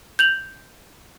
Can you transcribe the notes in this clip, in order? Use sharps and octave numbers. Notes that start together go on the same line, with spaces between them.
G6 F7 F#7